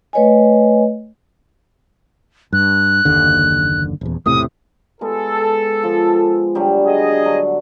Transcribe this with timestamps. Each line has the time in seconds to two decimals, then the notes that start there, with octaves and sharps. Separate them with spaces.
0.13 A3 B4 C#5 D#5 G#5
2.53 G2 F#6
3.05 F#1 D#2 D3
4.01 D#1 E2
4.26 E1 A2 C3 D#6
5.01 G#3 B3 A4
5.83 F3
6.55 D3 F#3 G3
6.86 G#4 D#5
7.25 D3 F#3